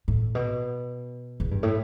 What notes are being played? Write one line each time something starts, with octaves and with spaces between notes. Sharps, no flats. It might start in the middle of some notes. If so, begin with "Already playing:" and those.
A2
B2
E2
G2
A2